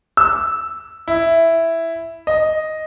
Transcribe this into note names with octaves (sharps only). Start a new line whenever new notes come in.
E6
E4
D#5